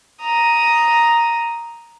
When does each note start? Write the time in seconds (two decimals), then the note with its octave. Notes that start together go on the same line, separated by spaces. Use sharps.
0.21 A#5 D#6